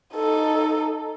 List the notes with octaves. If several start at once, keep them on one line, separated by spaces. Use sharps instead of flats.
D#4 A4